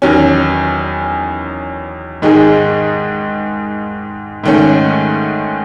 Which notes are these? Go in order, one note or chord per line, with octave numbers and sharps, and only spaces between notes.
E2 D#3 F#3 C#4
G#2 D#3 G#3 D#4 G#4
G#2 D#3 A3 C#4